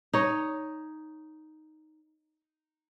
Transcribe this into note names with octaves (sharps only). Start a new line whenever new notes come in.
D#4 C#5